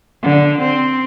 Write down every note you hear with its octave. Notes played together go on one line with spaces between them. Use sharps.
D3
C4